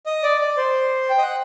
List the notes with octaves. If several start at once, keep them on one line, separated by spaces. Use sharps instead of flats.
D#5
D5
D5
C5
G5
D#5
F#5